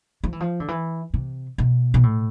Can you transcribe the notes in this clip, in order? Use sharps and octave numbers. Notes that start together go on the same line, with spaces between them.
F3
E3
F3
D3
E3
C3
B2
B2
A2